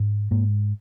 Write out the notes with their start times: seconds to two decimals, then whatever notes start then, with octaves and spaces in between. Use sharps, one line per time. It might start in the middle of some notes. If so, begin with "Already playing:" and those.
Already playing: G#2
0.31 G#2 A#3